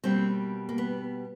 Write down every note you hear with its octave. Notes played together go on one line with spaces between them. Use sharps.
B2 G3 A#3 C4
A#3
B3